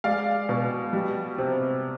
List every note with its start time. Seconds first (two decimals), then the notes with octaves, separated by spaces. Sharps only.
0.04 G#3 D5 F5
0.49 B2
0.93 G3
1.38 C3